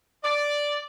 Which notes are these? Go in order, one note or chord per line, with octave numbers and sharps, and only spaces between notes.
D5